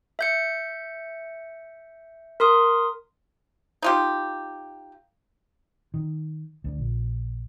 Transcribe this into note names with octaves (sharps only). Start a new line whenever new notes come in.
E5 G6 C#7
A#4 C6 D#6
D#4 F4 G4
D#3
D2 D3
A#1